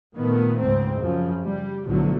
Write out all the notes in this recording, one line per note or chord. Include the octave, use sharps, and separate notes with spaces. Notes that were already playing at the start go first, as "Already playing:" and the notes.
A#2 D#3 A3 B3
C#2 G#2 C4
F#2 C#3 F3
G3
B1 A2 D3 F3 F#3